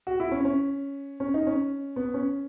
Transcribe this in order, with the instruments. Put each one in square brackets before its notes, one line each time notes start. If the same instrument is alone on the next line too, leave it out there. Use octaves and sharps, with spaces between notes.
[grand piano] F#4
E4
C#4
C#4
C#4
D#4
C#4
B3
C#4